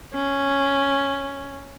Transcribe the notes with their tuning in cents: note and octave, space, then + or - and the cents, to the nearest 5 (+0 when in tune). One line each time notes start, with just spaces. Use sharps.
C#4 +0